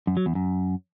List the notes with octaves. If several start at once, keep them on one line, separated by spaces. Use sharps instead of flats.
F#2
F#3
E2
F#2